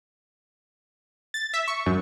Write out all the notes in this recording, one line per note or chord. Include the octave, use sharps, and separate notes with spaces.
A6
E5
C#6
F#2